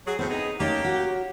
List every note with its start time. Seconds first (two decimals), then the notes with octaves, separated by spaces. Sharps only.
0.06 F#3 G#4
0.19 A2 F#3 B3 C4
0.30 C3 D#4 G#4
0.60 A3 A#3 C#4 D#4 G4 A5
0.84 F#4